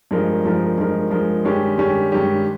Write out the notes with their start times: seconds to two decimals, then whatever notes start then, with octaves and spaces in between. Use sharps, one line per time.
0.11 G2 F3 G#3 D#4 A#4
0.45 G2 F3 G#3 D#4 A#4
0.78 G2 F3 G#3 D#4 A#4
1.11 G2 F3 G#3 D#4 A#4
1.45 G2 D#3 G#3 C#4 G4
1.78 G2 D#3 G#3 C#4 G4
2.12 G2 D#3 G#3 C#4 G4